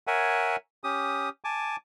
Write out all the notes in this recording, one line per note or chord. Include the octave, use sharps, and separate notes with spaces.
A#4 C#5 E5 F#5 G#5
C#4 G4 D#6
G#5 A5 D6